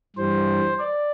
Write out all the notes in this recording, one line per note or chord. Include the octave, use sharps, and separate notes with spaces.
G2 E3 G3 C5
D5